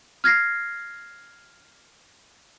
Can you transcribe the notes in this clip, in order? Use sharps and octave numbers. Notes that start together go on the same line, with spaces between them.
F6 G#6 A#6 C7